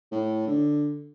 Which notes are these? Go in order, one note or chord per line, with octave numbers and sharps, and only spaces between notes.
A2
D3